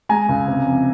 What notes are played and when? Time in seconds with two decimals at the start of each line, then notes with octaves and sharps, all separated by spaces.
0.09 G#3 G#5 A#5
0.29 C#2
0.48 C3
0.66 F2